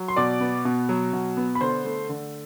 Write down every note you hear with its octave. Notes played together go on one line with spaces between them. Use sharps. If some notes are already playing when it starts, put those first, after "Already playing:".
Already playing: F#3
C6
B2 D5 D6
B3
B2
F#3
B2
B3
B5
D3 C5 C6
A3
D3